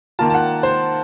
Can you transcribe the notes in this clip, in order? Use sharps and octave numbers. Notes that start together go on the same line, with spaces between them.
D#3 A#3 F4 A5
A5
F#5
C5